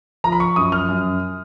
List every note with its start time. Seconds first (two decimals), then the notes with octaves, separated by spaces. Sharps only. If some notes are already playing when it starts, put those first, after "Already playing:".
0.24 F3 A#5
0.32 B5
0.40 C#6
0.56 F#2 D#6
0.72 F6
0.89 F#2